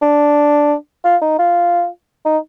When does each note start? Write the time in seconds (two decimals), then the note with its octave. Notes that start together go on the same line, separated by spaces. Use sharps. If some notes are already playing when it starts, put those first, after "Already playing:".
0.02 D4
1.04 F4
1.22 D#4
1.39 F4
2.26 D#4